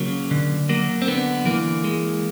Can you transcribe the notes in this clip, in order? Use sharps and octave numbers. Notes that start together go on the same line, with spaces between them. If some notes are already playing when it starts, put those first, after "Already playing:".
Already playing: C#3 F#3 A#3
D3
F#3 A#3
C4
D3 B3
E3 A#3
G#3